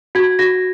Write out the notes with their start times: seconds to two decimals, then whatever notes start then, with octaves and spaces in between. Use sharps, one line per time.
0.15 F#4 G#6
0.39 F#4 A#6